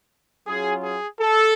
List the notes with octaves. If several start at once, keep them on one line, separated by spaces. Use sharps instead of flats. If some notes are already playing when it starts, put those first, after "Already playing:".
F#3 C#4 F4 G#4
G#4
A4